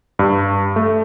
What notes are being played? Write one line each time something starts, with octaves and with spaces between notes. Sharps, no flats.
G2
A3